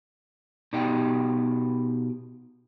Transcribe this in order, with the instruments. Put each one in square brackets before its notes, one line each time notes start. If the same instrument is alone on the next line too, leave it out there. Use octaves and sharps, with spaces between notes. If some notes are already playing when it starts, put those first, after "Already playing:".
[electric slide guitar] B2 D#4 G4 D5 G5